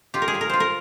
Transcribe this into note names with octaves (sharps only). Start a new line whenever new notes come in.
F4 G4
A#4
G#4
G3
A#4
F4 C5
A#4